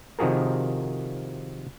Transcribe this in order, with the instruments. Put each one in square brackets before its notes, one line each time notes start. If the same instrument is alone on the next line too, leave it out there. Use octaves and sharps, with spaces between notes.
[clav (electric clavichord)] C3 D#3 F3 F#4 G#4 A#4